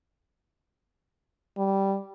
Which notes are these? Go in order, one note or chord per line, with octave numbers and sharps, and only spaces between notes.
G3